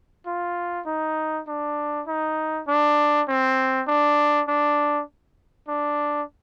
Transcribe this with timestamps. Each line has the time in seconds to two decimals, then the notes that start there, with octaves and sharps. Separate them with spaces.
0.27 F4
0.86 D#4
1.48 D4
2.07 D#4
2.68 D4
3.28 C4
3.88 D4
4.48 D4
5.68 D4